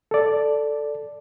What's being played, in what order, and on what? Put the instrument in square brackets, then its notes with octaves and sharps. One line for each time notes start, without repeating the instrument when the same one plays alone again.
[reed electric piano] A4 D5